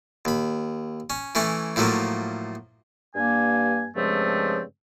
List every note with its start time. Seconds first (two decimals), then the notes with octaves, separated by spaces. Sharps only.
0.25 D#2 B5
1.10 C#4
1.35 E3 A3 C#4 E4
1.76 A2 F3 F#3 A3 A#3
3.16 G2 A#3 G#5
3.95 G2 C#3 F3 G#3 A3 C4